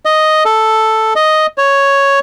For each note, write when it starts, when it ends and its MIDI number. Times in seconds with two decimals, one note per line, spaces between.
0.05 0.44 75
0.45 1.14 69
1.16 1.46 75
1.58 2.19 73